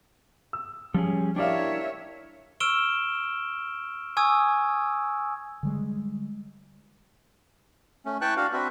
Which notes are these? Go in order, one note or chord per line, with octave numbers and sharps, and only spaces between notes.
E6
F3 G3 C#4 G#4
D4 E4 G4 A#4 C#5 D5 E5 F5
C#6 E6 F6 D7 E7 G7
G#5 C#6 D#6 E6 G#6
D3 G3 G#3
A3 C#4
E4 B4 G5 A5 C#6 F#6
D4 F#4 F5
C4 D4 F#4 B4 E5